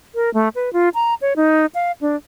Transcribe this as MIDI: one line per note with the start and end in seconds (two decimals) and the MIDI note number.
0.15 0.32 70
0.34 0.49 57
0.55 0.72 71
0.73 0.89 65
0.94 1.14 82
1.22 1.33 73
1.36 1.66 63
1.75 1.92 77
2.01 2.16 62